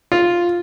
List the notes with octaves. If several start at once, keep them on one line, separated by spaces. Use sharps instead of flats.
F4